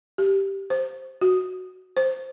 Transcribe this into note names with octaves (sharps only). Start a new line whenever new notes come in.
G4
C5
F#4
C5